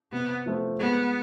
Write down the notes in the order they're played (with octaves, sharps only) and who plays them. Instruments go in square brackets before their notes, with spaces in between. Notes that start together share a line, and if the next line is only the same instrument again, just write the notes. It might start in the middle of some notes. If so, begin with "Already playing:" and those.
[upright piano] C3 [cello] B3
[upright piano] F3 A3 C4 F4
[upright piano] G#3 [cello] B3